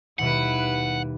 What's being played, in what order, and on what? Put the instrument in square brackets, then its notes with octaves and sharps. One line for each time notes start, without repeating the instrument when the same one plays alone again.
[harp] D#2 B2 G3 [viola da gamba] E4 B4 [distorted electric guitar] F#5